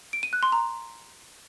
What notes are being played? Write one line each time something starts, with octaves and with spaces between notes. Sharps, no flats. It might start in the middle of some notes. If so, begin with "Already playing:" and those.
D7
D#7
F#6
C6
A#5